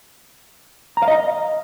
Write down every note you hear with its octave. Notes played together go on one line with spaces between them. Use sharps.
A#5
F5
D#5